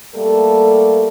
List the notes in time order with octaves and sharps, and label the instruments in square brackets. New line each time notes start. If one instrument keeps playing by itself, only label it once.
[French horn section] G3 A3 A#3 A4